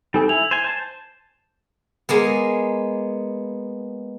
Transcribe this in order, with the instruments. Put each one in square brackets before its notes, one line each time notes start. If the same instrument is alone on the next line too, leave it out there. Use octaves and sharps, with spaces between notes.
[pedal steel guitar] G3 C4 [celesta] D#4 A4 G#5
[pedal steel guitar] E4 [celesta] F7
[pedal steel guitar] C5 G#5
C5 A5
[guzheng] G#3 A#3 B3